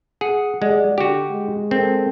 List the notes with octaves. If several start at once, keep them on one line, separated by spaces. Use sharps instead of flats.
G#4 F#5 C#7
G#3 G4 D5 D#5 F#5
D3 F#4 G4 G5
G#3
C4 A4 A#4